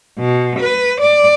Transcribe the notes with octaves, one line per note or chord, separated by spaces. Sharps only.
B2
B4
D5